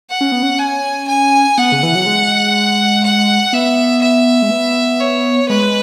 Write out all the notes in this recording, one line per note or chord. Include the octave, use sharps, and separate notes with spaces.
F#5
C#4
B3
C#4
G#5
G#5
B3 F#5
C#3
E3
F#3
G#3
F#5
B3 E5
E5
G#3
B3
C#5
G#3 B4